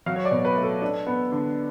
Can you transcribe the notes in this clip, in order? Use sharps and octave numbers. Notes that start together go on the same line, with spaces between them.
F#3 F5
C#5
D5
B2
B4
A3
A4
D4
B3
D3